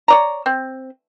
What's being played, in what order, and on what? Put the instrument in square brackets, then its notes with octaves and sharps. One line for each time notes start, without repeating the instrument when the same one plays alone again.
[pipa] C#5 D5 A#5
C4